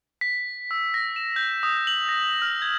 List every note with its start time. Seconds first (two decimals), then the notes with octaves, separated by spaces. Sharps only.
0.21 B6
0.71 E6
0.94 A#6
1.16 E7
1.36 G6
1.63 D#6
1.87 F#7
2.09 A#6
2.42 F6
2.62 G#6